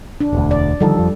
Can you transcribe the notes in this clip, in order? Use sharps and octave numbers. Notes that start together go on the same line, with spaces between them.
D4
E1 D2
D5
D3 D#3 F3 G3 A4
F2 F3